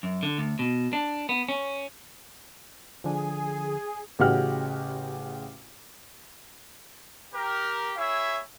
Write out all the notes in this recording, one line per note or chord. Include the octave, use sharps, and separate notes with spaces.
F#2
D3
D2
B2
D4
B3
C#4
D3 F3 D4 G#4 G#5
A1 C#3 F#4 G4 F#5 F6
G4 A#4
E4 G#4 C#5 E5